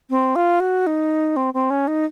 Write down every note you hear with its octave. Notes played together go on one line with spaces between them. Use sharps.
C4
F4
F#4
D#4
C4
C4
C#4
D#4